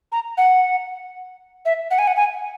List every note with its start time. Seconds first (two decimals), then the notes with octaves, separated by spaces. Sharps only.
0.12 A#5
0.37 F#5
1.65 E5
1.91 F#5
1.98 G#5
2.07 F#5
2.16 G#5